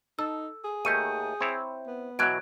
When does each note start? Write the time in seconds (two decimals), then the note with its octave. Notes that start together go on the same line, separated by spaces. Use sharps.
0.19 D#4 A4 E6
0.64 G#4
0.85 D#2 D#3 A3 G6 C#7 D#7
1.41 C4 E4 C#5
1.88 B3
2.19 B2 E3 F#3 F#6 G#6 D7